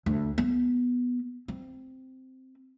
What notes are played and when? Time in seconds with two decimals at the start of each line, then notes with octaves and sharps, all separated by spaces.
0.06 D2
0.38 B3
1.48 C4